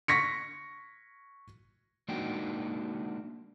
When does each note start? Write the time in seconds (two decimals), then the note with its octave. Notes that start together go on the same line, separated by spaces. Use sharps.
0.08 C#6 A#6 B6 C#7
2.08 G#3 A#3 D4 D#4 F#4 G5